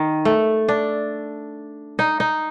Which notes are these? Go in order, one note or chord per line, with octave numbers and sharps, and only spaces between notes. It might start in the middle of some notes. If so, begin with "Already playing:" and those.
Already playing: D#3
A3
D4
D#4
D#4